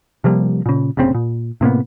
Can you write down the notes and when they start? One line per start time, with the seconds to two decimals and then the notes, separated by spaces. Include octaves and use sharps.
0.24 C3 F3 G3 A#3
0.66 A#2 C#3
0.97 F1 A#1 C#3 C4
1.15 A#2
1.61 A2 C3 A#3 B3